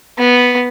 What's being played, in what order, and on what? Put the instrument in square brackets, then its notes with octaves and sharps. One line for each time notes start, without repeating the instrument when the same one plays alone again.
[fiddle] B3